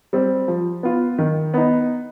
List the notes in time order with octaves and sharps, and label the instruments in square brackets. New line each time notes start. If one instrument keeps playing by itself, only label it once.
[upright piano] G3 C4
F3
B3 F4
D#3
B3 D#4